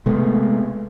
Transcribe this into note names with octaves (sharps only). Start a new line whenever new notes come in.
C3 G#3 A3 B3